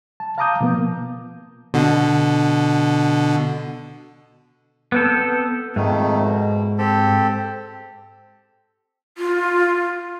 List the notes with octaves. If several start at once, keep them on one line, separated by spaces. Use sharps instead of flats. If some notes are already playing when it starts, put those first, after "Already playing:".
A5
F5 A5 A#5 D6 D#6 G6
B2 F3 A#3 B3
B2 D3
B3 C4 A4
F2 G#2 D#3 A3
B2
C4 G4 A4
F4